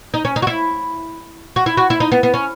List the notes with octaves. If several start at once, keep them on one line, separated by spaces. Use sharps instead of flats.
D#4
C#4
D#4
F#4
E4
F#4
E4
F#4
E4
D#4
B3
B3
C#4